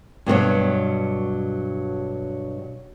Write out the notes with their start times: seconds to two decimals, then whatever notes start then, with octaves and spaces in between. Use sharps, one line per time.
0.26 G2 B2 D#3 F#3